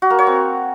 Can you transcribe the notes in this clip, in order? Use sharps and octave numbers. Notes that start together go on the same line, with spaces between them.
F#4
A#3
C#5
C4